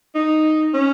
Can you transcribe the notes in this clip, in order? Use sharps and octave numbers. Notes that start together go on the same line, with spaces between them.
D#4
C#4